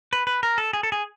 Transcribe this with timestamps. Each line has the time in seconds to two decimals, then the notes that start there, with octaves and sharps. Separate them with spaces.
0.13 B4
0.27 B4
0.43 A#4
0.58 A4
0.73 G#4
0.83 A4
0.92 G#4